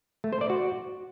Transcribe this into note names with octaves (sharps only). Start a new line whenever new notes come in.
A3
C5
D5
F#4